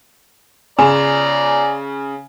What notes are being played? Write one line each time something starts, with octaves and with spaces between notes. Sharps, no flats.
C#3 D5 G#5 A#5